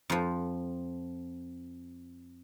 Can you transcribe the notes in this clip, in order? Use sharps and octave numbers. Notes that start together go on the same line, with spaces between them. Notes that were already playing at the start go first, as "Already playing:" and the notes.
F2 F3